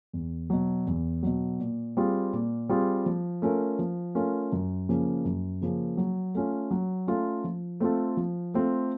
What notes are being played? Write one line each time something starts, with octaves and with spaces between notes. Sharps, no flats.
E2
B2 F#3
E2
B2 F#3
A#2
G3 C4 F4 G#4
A#2
G3 C4 F4 G#4
F3
A3 C#4 F4 A#4
F3
A3 C#4 F4 A#4
F#2
C#3 F3 A#3 C#4
F#2
C#3 F3 A#3 C#4
F#3
A3 C#4 F4
F#3
A3 C#4 F4
F3
A3 C4 F4 A4
F3
A3 C4 F4 A4